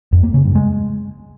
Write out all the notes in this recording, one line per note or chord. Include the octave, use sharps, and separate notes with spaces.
F2
A#3
C#3
G2
G#3